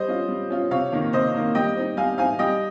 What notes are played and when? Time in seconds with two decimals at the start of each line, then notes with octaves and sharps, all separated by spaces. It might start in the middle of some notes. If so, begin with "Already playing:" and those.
Already playing: G3 C5 D#5
0.08 C#4 F4
0.29 G3
0.50 C#4 F4
0.71 C3 C#5 F5
0.92 D#3 A#3
1.13 C3 C5 D#5
1.34 D#3 A#3
1.55 G3 D#5 G5
1.76 C4 D#4
1.97 G3 F5 G#5
2.18 C4 D#4 F5 G#5
2.39 G3 D#5 G5